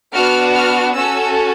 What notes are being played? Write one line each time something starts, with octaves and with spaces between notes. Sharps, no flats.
B3 D4 F#4 F6
F6
C#4 F#4 A4 E6